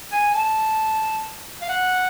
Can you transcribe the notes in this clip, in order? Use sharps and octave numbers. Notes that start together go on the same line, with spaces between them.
G#5
A5
F5
F#5